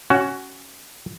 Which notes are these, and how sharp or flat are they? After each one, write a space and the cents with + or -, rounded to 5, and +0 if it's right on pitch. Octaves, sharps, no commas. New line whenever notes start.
C#4 +0 F#4 +15